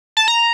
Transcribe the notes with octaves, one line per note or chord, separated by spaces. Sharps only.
A5
A#5